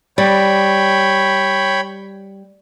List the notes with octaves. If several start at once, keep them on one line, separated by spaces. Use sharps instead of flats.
G3 C#5 G5 B5